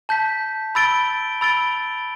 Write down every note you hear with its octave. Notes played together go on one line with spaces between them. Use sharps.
A5 G6 B6
B5 E6 A6 D7 G7
B5 E6 A6 D7 G7